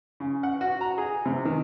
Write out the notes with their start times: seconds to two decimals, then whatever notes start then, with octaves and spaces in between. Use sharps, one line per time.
0.20 C#3
0.43 F#5
0.61 F#4
0.81 A#5
0.98 G#4
1.25 C3
1.45 D#3